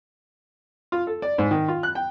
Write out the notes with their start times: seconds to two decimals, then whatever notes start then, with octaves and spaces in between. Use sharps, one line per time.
0.92 F4
1.07 A4
1.22 D5
1.38 G#2
1.51 D#3
1.68 F4
1.83 F#6
1.95 G5